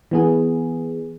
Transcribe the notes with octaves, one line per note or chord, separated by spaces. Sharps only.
E3 B3 G#4